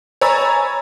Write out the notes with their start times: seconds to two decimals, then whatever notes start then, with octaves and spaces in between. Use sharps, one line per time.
0.21 C#5 G#5 A#5 B5 E6 A6